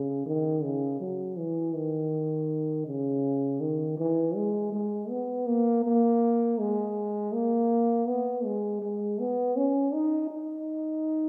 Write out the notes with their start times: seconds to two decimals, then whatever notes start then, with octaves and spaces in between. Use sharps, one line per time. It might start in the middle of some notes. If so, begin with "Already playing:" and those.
Already playing: C#3
0.26 D#3
0.63 C#3
1.00 F#3
1.38 E3
1.75 D#3
2.86 C#3
3.61 D#3
3.98 E3
4.35 G#3
4.72 G#3
5.10 B3
5.47 A#3
5.84 A#3
6.59 G#3
7.33 A#3
8.08 B3
8.45 G#3
8.82 G#3
9.19 B3
9.56 C#4
9.94 D#4
10.31 D#4